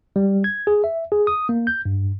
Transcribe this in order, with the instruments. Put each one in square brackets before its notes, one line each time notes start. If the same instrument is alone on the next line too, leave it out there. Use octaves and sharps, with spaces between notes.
[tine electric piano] G3
G#6
G#4
E5
G#4
D#6
A#3
G6
G2